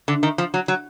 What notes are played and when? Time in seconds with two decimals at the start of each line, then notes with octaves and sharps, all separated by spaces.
0.08 D3
0.23 D#3
0.38 F3
0.54 F#3
0.68 F#3